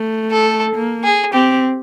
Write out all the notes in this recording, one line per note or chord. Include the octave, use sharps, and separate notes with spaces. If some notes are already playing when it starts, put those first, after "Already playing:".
Already playing: A3
A4
A#3
G#4
C4 G4